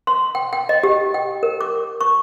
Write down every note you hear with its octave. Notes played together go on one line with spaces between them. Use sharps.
C6
G5
G5
D#5
G4
G5
A#4
D6
C#6